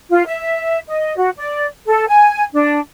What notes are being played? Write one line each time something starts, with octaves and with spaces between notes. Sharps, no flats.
F4
E5
D#5
F#4
D5
A4
G#5
D4